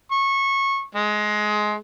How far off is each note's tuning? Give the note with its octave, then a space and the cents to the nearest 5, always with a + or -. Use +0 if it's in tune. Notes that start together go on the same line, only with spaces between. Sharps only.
C#6 -20
G#3 +20